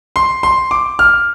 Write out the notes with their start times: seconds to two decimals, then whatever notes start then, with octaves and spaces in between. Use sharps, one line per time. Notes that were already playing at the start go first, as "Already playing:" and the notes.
0.16 C6
0.43 C6
0.71 D6
0.99 F6